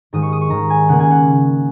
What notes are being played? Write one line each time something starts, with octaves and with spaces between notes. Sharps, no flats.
G#2 D#3 G#3 D#6
C#6
D#6
C#6
G#2 D#3 G#3 A#5
G#5
C#3 A#3 F#5
G#5
F#5